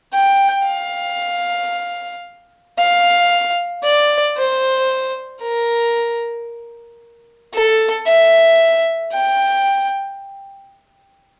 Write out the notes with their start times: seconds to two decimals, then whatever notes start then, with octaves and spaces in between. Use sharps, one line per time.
0.14 G5
0.66 F5
2.78 F5
3.84 D5
4.37 C5
5.42 A#4
7.54 A4
8.07 E5
9.13 G5